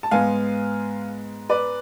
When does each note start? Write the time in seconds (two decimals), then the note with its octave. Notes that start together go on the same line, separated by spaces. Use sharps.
0.03 A5
0.11 G#2 G#3 B3 F5 G#5
1.49 B4 D5